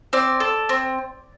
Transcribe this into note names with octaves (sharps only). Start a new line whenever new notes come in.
C4 D5
A4
C4